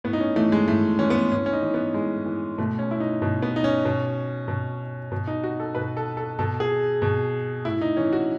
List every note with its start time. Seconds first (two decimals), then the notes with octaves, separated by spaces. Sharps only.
0.04 A2 B3
0.13 D#4
0.20 C#4
0.36 E3 A3
0.52 G#3
0.68 A2 A3
0.99 E3 C#4
1.10 B3
1.31 A2 C#4
1.46 C#4
1.53 D#4
1.63 E3
1.74 B3
1.94 A2 G#3
2.26 E3
2.58 B2 A3
2.79 C#4
2.91 E4
3.00 D#4
3.22 B2
3.42 B3
3.56 D#4
3.64 C#4
3.85 B2
4.48 B2
5.12 B2
5.27 D#4
5.44 F#4
5.60 A4
5.75 B2 B4
5.97 A4
6.17 A4
6.39 B2 A4
6.60 G#4
7.02 B2
7.65 A2 E4
7.81 D#4
7.97 E3 C#4
8.13 F#4